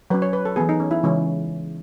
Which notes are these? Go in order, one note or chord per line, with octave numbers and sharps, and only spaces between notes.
F#3 C#4 B4
C#5
B4
A4
E3 B3 G#4
D#4
C#4
E4
C#3 E3 G#3 C#4